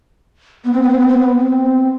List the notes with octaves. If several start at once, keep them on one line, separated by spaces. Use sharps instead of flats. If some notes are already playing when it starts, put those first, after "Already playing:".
B3
C4
B3
C4
B3
C4
B3
C4